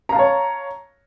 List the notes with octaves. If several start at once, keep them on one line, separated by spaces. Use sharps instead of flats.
C#5 F5 A5 A#5